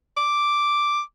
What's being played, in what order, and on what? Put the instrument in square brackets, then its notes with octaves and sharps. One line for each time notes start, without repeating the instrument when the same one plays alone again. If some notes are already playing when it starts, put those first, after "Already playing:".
[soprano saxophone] D6